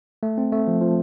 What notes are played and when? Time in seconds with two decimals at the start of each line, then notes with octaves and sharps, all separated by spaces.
0.23 A3
0.38 C4
0.52 A3
0.67 F3
0.81 F3